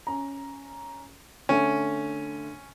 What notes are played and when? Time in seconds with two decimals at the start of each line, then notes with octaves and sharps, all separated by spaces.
0.07 C#4 A#5
1.49 D3 A3 C#4